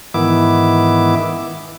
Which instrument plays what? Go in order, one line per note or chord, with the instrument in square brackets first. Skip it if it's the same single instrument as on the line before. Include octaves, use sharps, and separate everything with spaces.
[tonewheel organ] G#2 D#3 E3 B3 E4 D6